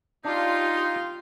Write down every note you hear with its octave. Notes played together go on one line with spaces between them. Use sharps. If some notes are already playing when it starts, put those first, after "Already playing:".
D4 D#4 F4 G4 F5 C6